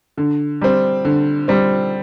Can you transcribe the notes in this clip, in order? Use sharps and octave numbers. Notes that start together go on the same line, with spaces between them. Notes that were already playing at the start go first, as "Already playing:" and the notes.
D3
G3 C4
D3
G3 C4